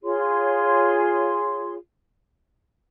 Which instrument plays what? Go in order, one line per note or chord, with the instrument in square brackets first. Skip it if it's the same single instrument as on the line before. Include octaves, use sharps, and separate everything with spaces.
[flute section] F4 G#4 C#5 C6